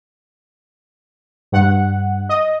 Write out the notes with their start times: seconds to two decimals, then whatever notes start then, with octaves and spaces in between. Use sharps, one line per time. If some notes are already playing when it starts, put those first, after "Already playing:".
1.52 G2 F#5
2.29 D#5